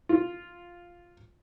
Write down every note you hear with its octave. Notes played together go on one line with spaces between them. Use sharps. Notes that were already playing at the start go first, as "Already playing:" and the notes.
F4